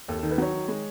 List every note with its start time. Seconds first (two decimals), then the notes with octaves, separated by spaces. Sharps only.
0.08 D#2 A4
0.19 D#3 A4
0.31 B4
0.38 F#3 C#5
0.53 D#3
0.68 G#3